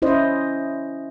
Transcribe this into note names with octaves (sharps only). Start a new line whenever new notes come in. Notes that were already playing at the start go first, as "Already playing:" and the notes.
C#4 E4 C5 D#5